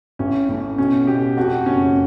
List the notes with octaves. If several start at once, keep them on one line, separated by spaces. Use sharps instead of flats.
A1 C#4
A2 C#4
B2 C#4
B2 G4
F2 F#4
F#1 C#4